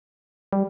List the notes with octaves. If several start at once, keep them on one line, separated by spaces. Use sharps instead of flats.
G3